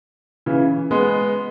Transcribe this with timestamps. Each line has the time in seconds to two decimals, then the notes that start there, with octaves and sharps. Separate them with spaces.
0.46 C#3 E3
0.91 G#3 B3